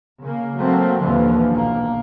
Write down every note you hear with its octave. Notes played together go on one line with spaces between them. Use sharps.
C#3 A#3
F#3 A3 A#3 C4
D#2 A#2 D3 E3 F3
B1 A#3